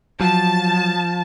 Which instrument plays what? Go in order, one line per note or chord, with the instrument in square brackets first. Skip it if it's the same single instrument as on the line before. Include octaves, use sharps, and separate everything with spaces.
[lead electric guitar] F3 [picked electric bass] F#3 [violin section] A5